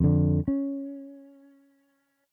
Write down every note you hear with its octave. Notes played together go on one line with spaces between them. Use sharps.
F2 D3
C#4